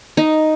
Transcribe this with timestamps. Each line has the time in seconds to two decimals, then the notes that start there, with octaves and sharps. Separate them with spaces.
0.17 D#4